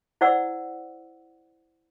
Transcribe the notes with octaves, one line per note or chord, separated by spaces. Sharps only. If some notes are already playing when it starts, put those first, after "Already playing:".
E4 C5 D5 F#5 E6